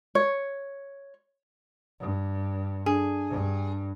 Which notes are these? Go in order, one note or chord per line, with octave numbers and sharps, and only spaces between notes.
C#5
G2
D4 G#4
G2